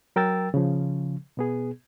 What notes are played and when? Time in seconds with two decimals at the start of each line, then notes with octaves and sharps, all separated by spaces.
0.16 F#3 A#4 G5 E6 A6
0.54 C#3 F3
1.37 B2 B3 G#4